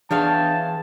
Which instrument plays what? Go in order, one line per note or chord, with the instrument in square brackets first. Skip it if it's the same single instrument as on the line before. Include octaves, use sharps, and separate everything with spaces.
[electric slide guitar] E3 G#4 B4 [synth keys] D4 [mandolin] C#5 F5 G5 [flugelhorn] A5